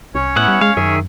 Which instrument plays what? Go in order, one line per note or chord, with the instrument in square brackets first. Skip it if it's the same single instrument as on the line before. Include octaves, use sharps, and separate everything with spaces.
[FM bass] C2 [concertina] C#4 C#5
[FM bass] A2 [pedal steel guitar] B3 E4 F#5
[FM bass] G3
[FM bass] G#3 [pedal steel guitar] F5
[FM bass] F#2 [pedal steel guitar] D#3 G#4 E5